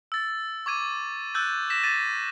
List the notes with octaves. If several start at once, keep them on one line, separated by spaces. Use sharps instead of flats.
E6 A6
C#6 D6 G#6 D#7
E6 F#6 G6 A6
A#6 B6 E7
D6 A6 D#7